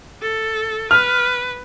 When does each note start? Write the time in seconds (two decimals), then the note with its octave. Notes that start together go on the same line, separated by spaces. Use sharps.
0.22 A4
0.91 B4 F6